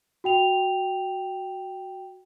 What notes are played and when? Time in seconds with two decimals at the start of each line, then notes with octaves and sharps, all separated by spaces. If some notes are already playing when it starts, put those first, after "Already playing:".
0.24 F#4 G5 F7